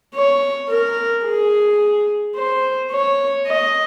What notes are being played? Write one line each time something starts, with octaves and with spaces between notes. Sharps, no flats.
C#5
A#4
G#4
C5
C#5
D#5